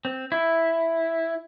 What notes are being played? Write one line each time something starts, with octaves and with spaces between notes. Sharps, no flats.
C4
E4